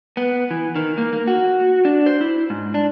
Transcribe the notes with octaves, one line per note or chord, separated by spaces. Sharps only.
B3
E3
D#3
A#3
A#3
F#4
D4
C5
E4
G#2
D4